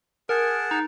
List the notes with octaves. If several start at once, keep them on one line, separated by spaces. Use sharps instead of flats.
G#4 A#4 F#5 A5
D#4